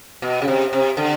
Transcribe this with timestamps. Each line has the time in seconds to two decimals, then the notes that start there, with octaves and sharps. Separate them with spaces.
0.22 B2
0.42 C#3
0.48 C3
0.73 C3
0.97 D3